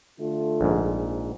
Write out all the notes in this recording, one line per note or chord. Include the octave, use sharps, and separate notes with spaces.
D3 A3 F4
A#1 G#2